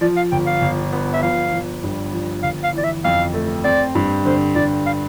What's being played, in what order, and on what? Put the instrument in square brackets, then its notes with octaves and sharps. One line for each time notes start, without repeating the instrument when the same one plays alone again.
[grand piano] F3 [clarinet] D5
[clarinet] F5
[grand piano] G1 [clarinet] G5
[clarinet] F5
[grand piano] G1
B3
[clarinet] E5
[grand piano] F3 [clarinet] F5
[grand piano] F3
G2
F3
[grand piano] G1 [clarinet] F5
[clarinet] F5
[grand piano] E3 [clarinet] D5
[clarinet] E5
[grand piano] F2 [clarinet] F5
[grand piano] A3
[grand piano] C4 [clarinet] D5
[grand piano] G2
[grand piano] D3 [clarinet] C5
[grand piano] G2 [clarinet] D5
[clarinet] F5